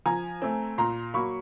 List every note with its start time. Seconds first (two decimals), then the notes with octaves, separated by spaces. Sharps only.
0.06 F3 G#5 A#5
0.42 A3 C4
0.78 A#2 A#5 C6
1.14 F#3 A#3 B5 C#6